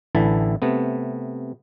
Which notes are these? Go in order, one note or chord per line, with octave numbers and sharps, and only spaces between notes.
A1 D3 E3 E4 E5 A5
C3 A3 B3